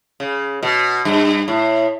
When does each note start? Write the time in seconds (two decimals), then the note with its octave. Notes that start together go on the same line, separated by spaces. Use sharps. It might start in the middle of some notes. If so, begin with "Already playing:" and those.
0.20 C#3
0.63 B2
1.05 G2
1.48 A2